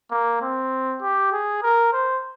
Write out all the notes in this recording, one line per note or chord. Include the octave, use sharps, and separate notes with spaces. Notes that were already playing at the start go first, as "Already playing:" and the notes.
A#3
C4
G4
G#4
A#4
C5